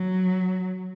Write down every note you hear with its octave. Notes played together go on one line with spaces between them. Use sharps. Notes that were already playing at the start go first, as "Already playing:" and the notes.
Already playing: F#3